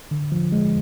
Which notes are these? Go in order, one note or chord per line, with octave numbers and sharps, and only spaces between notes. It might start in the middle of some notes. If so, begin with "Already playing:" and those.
D3
F3
G#3